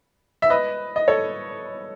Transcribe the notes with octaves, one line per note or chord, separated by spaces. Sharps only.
E5
B4 D#5
D#5
A4 C#5